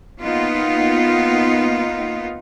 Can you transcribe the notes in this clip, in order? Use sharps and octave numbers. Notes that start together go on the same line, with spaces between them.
A#3 B3 D#4 F4